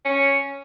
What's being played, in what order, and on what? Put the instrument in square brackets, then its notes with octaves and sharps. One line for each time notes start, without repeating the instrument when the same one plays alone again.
[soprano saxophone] C#4